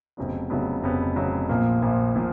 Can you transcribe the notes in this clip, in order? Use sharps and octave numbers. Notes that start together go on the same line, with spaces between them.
F1 F2 C#3 F#3 B3
F1 F2 C#3 F#3 B3
F1 F2 C#3 F#3 B3
F1 F2 C#3 F#3 B3
A#1 A#2 F3 A#3
A#1 A#2 F3 A#3
A#2 F3 A#3